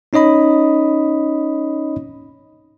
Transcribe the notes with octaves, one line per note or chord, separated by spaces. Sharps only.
C#4 D#4 C#5 D#5 B5